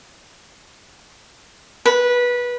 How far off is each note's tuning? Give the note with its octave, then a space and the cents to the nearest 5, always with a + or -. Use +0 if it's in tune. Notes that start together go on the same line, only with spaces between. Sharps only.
B4 -20